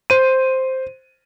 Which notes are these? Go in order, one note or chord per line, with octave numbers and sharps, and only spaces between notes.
C5 D#7